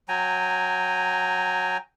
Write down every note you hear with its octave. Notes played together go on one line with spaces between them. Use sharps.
F#3 G5 G#5 A#5